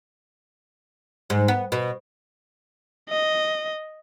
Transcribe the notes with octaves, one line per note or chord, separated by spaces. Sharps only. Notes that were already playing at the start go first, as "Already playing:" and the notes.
G#2
B3
B2
D#5